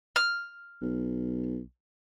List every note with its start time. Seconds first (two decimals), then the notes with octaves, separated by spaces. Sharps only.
0.16 F6
0.82 B1